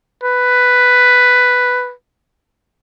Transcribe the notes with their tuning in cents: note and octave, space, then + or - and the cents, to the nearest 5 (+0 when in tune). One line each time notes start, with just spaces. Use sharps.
B4 +5